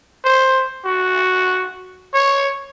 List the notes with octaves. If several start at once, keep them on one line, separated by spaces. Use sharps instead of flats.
C5
F#4
C#5